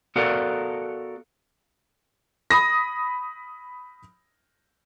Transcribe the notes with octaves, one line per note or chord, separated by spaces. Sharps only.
B3 F#4 A4 A#4 D5 F5
B5 D#6 A#6